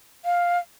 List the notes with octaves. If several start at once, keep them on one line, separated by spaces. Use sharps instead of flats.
F5